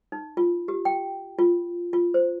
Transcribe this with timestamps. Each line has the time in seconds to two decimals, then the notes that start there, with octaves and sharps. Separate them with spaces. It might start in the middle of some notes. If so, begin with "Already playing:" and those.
0.12 D#4
0.37 F4
0.68 G4
0.85 G5
1.39 F4
1.93 F4
2.14 C5